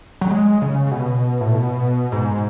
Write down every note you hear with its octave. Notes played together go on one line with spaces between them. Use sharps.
F#3
G#3
C#3
C#3
B2
A2
B2
G#2